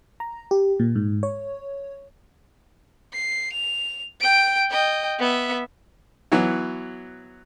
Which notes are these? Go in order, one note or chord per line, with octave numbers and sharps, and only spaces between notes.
A#5
G4
A#2
G#2
C#5
C7
F7
G5 D7
D#5 G5
B3 E5
E3 F#3 B3 F#4